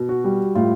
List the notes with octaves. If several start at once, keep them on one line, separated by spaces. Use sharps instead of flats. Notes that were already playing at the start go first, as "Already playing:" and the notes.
Already playing: B2
F#4
G3
A2 F4